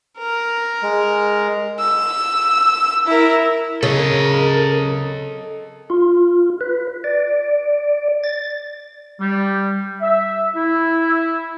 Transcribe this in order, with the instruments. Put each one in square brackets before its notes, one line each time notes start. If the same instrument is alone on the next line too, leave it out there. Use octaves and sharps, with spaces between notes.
[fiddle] A#4
[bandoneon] G#3
[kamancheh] E6
E4 A#4
[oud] C#3 [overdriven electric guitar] A4 D#5 [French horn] A#4
[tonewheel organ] F4
B4
D5
A6
[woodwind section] G3
E5
E4